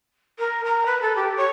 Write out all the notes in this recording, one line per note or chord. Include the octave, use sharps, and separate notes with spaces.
A#4
A#5
B4
A4
G4
C#5